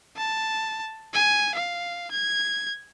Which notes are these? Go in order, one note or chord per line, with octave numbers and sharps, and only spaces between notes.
A5
G#5
F5
G#6